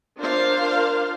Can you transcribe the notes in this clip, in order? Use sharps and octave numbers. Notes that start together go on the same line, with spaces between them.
D4 F4 A#4 C5 F5